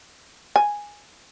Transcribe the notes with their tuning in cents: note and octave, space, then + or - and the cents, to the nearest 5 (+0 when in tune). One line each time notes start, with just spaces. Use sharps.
G#5 -5